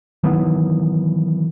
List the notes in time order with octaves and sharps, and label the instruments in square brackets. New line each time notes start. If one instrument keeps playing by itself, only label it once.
[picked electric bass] D#3 E3 F#3 B3